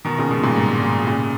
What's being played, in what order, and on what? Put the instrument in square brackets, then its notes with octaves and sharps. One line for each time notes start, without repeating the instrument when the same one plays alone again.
[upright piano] B2 D#3
A#2 C#3
G#2 B2
G2 A#2
G#2
G#2
A#2 C#3